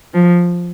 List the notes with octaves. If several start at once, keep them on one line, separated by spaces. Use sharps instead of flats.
F3